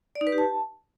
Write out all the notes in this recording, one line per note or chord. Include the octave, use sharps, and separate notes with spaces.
D5
D#4
B4
G4
A5